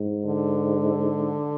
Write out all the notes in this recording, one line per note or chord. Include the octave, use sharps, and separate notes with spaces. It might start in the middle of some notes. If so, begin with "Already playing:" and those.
Already playing: G#2
D3